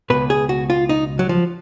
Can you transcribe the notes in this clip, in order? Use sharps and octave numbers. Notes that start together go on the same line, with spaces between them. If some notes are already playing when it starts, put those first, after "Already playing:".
C#2 B2 B4
G#4
F#4
F4
D#4
F#3
F3